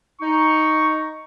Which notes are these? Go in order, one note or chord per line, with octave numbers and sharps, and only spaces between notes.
D#4 C#6